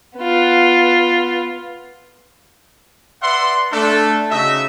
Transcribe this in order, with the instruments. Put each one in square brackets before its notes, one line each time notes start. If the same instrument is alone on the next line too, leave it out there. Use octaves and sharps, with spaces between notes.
[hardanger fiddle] B3 F4
[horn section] B4 D5 E5 F#5 C6
A3 D4 A4
C#3 D#4 F#4 D#5 E5